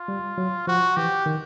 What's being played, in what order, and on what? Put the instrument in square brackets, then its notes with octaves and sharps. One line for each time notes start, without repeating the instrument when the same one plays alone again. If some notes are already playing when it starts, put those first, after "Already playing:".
Already playing: [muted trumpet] F4
[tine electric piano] G3
F#3
[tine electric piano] F3 [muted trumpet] F#4
[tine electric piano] E3 [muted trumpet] G4
[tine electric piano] D#3